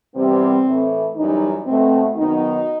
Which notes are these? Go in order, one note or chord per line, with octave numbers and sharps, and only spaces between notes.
E2 C3 E3 G3 B3 C4
A2 E3 A3
F#2 E3 G3 D#4
B2 A3 C4
F#2 D#3 F#3 B3 D#4